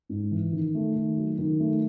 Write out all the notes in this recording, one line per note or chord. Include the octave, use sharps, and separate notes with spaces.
G#2
E3
D#3
A3
D#3
F#3
D#3
A3